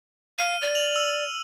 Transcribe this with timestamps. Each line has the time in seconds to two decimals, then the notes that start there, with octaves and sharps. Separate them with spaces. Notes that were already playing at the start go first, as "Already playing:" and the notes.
0.39 F5 F6 D#7
0.62 D5
0.75 F7 F#7
0.96 E6